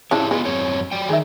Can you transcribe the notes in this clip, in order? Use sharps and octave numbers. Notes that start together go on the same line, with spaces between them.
C#3 F3 D4 E4 G4 C#5
G#3 B3 F4 B4
F#2 C4 C#5
F#3 D5 G5
D#3 D#4 G#4 E5